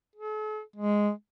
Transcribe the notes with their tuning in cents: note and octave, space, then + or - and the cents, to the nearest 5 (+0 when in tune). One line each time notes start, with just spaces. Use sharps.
A4 -45
G#3 +0